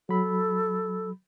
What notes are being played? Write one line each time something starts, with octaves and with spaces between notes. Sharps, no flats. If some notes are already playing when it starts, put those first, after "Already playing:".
F#3 A4 B5